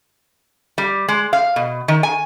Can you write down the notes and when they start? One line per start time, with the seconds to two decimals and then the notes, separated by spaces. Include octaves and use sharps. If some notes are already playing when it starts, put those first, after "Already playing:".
0.78 G3
1.08 G#3
1.33 F5
1.56 B2
1.88 D#3
2.03 G#5